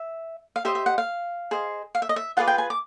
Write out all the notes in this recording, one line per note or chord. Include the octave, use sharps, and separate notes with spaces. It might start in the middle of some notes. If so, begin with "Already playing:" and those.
Already playing: E5
F5
G4 C5 D#5 E5
E5
F#5
F5
G#4 C5 D#5
F5
E5
D#5
E5
F4 G#4 B4 D5 F#5
G5
G#5
D6